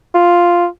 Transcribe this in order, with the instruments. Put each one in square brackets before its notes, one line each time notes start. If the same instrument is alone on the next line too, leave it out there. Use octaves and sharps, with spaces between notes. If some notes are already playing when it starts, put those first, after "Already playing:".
[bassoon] F4